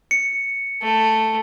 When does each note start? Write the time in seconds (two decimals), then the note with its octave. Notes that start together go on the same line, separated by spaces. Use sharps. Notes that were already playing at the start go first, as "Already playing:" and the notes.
0.11 C#7
0.81 A3